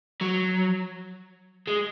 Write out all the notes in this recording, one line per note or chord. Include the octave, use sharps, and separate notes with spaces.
F#3
G#3